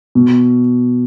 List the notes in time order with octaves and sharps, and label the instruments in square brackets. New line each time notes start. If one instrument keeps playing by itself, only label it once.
[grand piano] B2